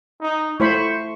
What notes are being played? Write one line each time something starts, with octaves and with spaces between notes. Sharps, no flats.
D#4
A3 E4 C5 B5 C#6